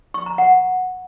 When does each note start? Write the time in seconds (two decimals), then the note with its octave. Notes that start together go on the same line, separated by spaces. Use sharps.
0.14 C#6
0.26 A#5
0.38 F#5